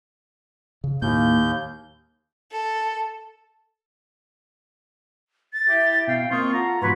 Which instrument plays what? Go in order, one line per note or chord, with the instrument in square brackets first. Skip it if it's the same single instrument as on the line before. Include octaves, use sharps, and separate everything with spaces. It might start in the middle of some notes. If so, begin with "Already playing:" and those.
[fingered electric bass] C#3
[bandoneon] D#2 G6 [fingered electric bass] A2 A#3
[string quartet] A4
[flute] A6
[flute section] E4 E5 [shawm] G4
[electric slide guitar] B2 [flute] F5 [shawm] G5
[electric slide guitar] A#3 C4 [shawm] F4 [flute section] D#5 C6 D#6 [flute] C#6
[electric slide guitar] F4 A4 [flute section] F#5 [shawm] A#5
[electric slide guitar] G#2 B2 F3 [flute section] F#4 C6 [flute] B4 [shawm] C#5